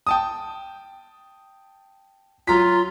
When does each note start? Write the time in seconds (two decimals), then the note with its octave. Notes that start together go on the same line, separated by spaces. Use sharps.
0.07 G5 A5 D#6
2.47 F#3 F4 A#5 B6